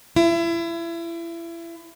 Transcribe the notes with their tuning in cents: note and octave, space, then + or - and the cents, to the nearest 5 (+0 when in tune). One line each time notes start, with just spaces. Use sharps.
E4 +30